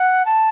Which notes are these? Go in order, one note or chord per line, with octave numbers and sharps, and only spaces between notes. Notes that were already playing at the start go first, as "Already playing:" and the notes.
Already playing: F#5
A5